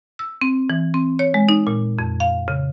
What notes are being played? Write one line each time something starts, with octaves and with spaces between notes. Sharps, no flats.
E6
C4
E3
C4
C#5
G#3
D#4
A#2
F2
F5
C#3